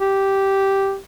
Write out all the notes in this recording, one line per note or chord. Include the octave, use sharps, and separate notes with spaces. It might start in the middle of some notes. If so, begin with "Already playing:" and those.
G4